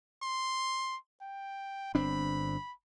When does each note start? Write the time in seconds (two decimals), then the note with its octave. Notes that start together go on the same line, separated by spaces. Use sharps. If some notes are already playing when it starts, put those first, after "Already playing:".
0.23 C6
1.22 G5
1.95 G1 C4 D4 B5